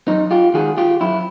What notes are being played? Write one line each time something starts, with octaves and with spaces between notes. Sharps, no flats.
F#2 D#4
F4 G4
D#3 G#3 F#4 G#4
F4 G4
F#2 E4